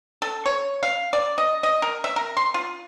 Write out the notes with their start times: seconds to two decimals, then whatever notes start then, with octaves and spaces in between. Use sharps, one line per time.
0.22 A4
0.46 C#5
0.83 F5
1.13 D5
1.38 D#5
1.63 D#5
1.82 A#4
2.04 E5
2.16 A#4
2.37 C6
2.54 F4